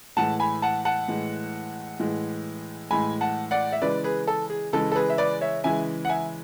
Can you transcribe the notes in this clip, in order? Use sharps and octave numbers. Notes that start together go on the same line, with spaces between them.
A2 E3 G#3 F#5 A5
G#5 B5
F#5 A5
F#5 A5
A2 E3 G#3
A2 E3 G#3
A2 E3 G#3 G#5 B5
F#5 A5
D5 F#5
E5
C#3 E3 G#3 B4 D5
G#4 B4
A4
G#4
C#3 E3 G#3 A4
A4
G#4 B4
E5
B4 D5
C#5 E5
C#3 E3 G#3 E5 G#5
F#5
E5 G#5